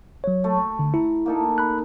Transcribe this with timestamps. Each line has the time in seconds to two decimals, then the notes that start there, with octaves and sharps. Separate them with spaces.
0.24 F#3 C#5
0.44 A3
0.79 D3
0.94 E4 A#5
1.26 A#3 D#4 A4
1.58 B5 F#6